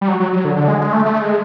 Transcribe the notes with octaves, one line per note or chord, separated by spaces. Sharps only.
G3
F#3
F#3
F#3
D3
D3
G#3
G#3
A3
A3
G#3